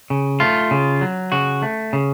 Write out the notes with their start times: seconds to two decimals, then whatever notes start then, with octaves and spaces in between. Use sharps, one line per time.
0.10 C#3
0.40 A3 F4
0.71 C#3
1.01 F#3
1.32 C#3 F#4
1.62 A3
1.93 C#3